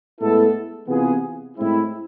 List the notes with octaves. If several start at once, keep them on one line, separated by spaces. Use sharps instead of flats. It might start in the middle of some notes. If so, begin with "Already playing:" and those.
A2 G#3 B3 E4 A4
C3 E3 B3 F4 G#4
A2 G#3 C4 E4